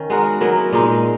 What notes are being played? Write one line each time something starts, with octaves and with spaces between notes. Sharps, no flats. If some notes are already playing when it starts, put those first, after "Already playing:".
Already playing: D#3 C#4
G#3 B3 F#4 A#4
F#3 B3 E4 A#4
A#2 G#3 D#4